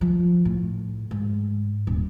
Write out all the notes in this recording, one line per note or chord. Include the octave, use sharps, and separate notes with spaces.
F3
A2
G#2
D#1